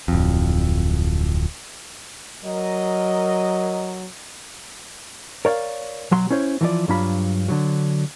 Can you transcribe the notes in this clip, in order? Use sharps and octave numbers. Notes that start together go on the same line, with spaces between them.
D1 F2
F#3 A#4 D#5
A#4 C#5 D5 F5
B1 F#3 C6
C#4 E4 C5 C#5
E3 F3 D5
G2 F#3 D4 F4 B5
D3 F3 F#3